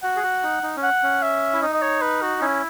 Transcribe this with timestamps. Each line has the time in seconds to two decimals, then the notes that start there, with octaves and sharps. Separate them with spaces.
0.03 F#4 F#5
0.16 G#4
0.23 F#4
0.43 D#4
0.63 D#4
0.76 C#4
0.83 F#5
1.03 C#4
1.22 E5
1.53 E4
1.62 D#4 D#5
1.74 D#5
1.82 C#5
2.02 B4
2.22 F#4
2.41 C#4 E4